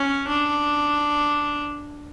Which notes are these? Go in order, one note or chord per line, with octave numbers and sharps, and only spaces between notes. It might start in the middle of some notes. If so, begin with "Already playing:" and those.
Already playing: C#4
D4